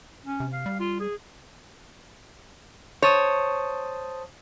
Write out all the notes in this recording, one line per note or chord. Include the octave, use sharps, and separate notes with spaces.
C#4
C3
F5
G3
F4
G#4
C5 C#5 A5 D#6